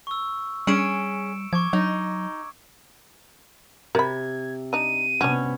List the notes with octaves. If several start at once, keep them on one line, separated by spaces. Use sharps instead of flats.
C#6 E6
G3 C#4 G#4 C#7 D7 E7
F3 C#6 D6 G#6
F#3 D#4
C3 A#4 B5 G#6
D4 D#4 D#7
C3 B3 C#4 D4 F#4